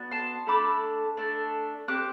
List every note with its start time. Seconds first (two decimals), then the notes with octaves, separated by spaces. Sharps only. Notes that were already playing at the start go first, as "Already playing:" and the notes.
Already playing: B3 D4 F#4
0.11 A5 C6
0.47 A3 D4 A4 B5 D6
1.17 A3 D4 A4
1.88 C4 G4 D6 F#6